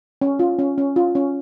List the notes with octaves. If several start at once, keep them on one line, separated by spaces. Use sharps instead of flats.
C#4
F4
C#4
C#4
F4
C#4